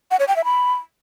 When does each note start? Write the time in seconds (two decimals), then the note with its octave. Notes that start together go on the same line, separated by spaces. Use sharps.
0.11 F#5
0.19 C#5
0.28 G5
0.36 E5
0.45 B5